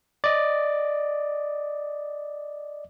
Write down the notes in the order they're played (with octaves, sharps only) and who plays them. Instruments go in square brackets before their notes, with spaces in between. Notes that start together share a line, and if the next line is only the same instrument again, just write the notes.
[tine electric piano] D5 D#5